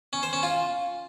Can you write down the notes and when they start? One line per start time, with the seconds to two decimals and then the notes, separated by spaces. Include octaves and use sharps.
0.13 C#4
0.23 C5
0.33 C#4
0.43 F4